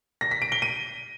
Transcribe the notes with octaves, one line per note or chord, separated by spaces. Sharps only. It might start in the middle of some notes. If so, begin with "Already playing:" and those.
A#6
B6
D7
G7
D#7